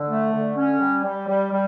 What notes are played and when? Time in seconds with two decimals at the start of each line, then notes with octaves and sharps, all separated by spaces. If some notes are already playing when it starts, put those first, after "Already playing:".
Already playing: D3
0.08 A3
0.32 D3
0.56 C#4
0.80 G3
1.04 G3
1.28 G3
1.52 G3